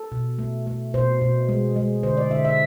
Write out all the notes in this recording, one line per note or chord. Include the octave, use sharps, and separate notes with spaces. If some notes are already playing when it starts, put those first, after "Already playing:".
Already playing: A4
B2
A3
A3
B2 C5
B2
G#3
G#3
D3 C5
D5
D3 E5
E5